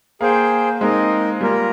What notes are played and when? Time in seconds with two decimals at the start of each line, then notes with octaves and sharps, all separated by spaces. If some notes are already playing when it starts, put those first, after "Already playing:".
0.21 A#3 G#4 C5 G5
0.80 G#3 C4 D#4 A#4 D#5
1.41 G3 A#3 F4 A#4